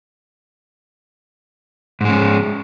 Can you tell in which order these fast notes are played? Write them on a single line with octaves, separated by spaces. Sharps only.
G#2 G#3 C#4